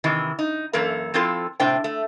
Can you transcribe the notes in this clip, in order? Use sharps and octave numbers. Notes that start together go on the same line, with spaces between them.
C3 D#3 E3
D#4
F#2 E3 A#3 A4 A#4
F3 C4 E4 F4 A4
A2 C3 D4 C5 G5
A3